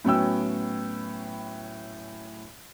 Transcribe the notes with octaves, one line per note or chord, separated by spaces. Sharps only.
A2 F#3 B3 C#4 G5 E6